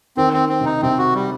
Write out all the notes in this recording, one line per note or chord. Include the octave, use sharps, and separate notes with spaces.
D#3 C4
C4
C4
C3 D#4
C3 C4
F#4
G3